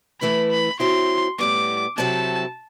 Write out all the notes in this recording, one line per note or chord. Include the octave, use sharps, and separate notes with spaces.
E3 A3 E4 B4 B5
B5
F#3 C4 E4 C6
A2 G3 B3 D6
C3 F#3 C4 E4 A4 A5